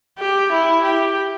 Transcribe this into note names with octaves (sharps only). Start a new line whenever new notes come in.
G4
E4
G4